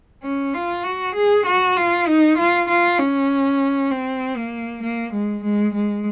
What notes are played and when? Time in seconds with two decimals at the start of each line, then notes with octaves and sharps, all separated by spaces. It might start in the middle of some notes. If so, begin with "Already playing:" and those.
0.23 C#4
0.54 F4
0.84 F#4
1.15 G#4
1.45 F#4
1.76 F4
2.07 D#4
2.37 F4
2.69 F4
2.99 C#4
3.91 C4
4.36 A#3
4.83 A#3
5.13 G#3
5.44 G#3
5.74 G#3